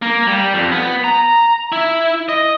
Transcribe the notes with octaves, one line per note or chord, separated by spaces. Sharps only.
A#3
G3
F2
B3
A#5
E4
D#5